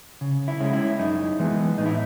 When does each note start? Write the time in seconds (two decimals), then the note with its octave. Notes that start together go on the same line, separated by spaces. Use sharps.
0.21 C#3
0.48 E4
0.60 G#3 C#4
0.73 E4
0.99 F#2 D#4
1.39 E3 G#3 B3
1.78 A2 D#4
1.86 E4